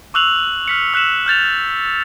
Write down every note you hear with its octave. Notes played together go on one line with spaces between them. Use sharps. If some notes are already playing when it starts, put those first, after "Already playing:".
C#6 D6 E6 F#6 F7 F#7
F6 B6 C#7
E6 F#6 B6 E7 F#7
F6 G6 A6 F7